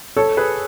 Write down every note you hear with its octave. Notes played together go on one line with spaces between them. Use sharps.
A4 C#5
G#4 B4